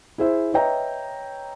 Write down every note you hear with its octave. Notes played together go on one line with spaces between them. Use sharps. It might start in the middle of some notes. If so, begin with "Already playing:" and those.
E4 G#4 C5 E5
B4 C#5 D#5 E5 G5 A#5